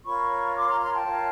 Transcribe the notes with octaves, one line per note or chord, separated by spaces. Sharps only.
F4 A#4 C#5 B5 C#6
C6 D6
A#5 C6
A#5 C6
G5 A5
F4 A#4 C#5